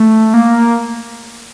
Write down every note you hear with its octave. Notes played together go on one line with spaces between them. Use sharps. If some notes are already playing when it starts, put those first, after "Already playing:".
Already playing: A3
A#3